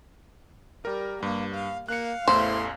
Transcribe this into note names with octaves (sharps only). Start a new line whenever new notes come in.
G3 A#4
G2 A#3
F5
A#3 F5 F#6 C#7
A1 E2 A3 E4 C5 C6